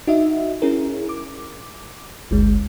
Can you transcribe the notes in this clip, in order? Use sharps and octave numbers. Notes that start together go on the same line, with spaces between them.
D#4 F#4 D#5 E5
C#4 E4 G#4 A#4
D6
G1 D2 G#3